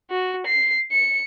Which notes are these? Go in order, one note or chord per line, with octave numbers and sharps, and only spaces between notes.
F#4
C7
C#7